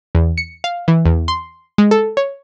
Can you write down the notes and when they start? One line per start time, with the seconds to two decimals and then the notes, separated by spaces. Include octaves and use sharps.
0.15 E2
0.38 C#7
0.64 F5
0.88 E3
1.06 E2
1.28 C6
1.78 G#3
1.91 A4
2.17 C#5